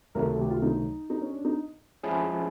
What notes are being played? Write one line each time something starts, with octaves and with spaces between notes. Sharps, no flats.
C#2 C3 D#3 F#3 A3 A#4
A4
G4
F4
D#4
D#4
C#4
D4
D#4
F3 G#3 C#4 E4 G#4